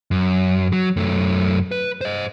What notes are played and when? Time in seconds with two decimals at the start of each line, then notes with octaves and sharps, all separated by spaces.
0.11 F#2
0.73 F#3
0.97 F#2 A3
1.72 B4
2.01 C5 D#5